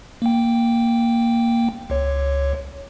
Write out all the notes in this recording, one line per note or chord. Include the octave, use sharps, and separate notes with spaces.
A#3 G5
C#2 C#5